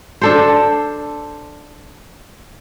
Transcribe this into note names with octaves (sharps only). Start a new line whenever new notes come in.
D4 A4 C5